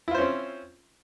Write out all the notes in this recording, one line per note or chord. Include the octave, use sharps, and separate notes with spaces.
C4 C#4 E4 F4 C5